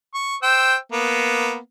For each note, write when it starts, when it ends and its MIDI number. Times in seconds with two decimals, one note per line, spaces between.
0.14 0.36 85
0.43 0.76 72
0.43 0.76 79
0.43 0.76 88
0.92 1.57 58
0.92 1.57 59